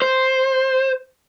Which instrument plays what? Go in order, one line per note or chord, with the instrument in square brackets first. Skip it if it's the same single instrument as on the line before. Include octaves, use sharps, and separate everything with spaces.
[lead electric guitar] C5